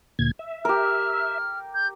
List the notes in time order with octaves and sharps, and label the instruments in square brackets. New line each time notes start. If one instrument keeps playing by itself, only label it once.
[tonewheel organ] D2 A#2 G#6
E5
[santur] G4 A#4 [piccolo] F6
[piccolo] G6